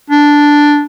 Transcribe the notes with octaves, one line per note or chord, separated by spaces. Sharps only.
D4